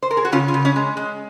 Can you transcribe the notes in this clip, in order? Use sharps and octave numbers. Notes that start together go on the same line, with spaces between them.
C5
A#4
G#4
F#4
C#3 C#4 F4
C#4 F4
C#3
C#4
G#3
G#3